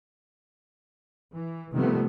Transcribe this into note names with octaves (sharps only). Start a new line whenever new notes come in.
E3
C3 D#3 F3 G3 A3 B3